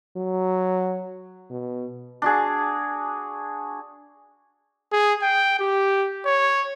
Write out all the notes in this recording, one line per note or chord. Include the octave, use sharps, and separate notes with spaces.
F#3
B2
D4 F#4 G#4
G#4
G5
G4
C#5